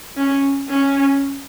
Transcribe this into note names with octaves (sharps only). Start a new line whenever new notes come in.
C#4
C#4